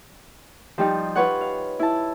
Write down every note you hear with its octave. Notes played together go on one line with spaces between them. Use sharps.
F3 G3 D#4
F4 B4 C#5 F#5
F5
E4 A5